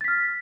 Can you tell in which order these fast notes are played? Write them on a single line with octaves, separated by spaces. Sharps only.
A6 B6 F6